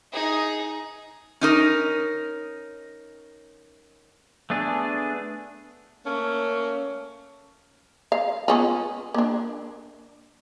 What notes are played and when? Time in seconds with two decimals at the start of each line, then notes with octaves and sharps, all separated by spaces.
0.12 D#4 G#4
1.41 C#4 D#4 A#4
4.50 A3 B3 D4 G#4
6.06 A3 A#3 C#4
8.12 F5
8.48 B3 C#4 F4
9.14 A#3 D4